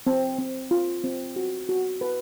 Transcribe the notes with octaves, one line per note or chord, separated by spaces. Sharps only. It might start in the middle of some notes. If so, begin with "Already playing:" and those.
C4
C4
F4
C4
F#4
F#4
B4